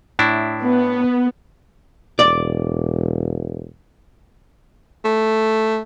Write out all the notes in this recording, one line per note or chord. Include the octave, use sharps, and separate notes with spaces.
A2 D4 E4
B3
E1 D5
A3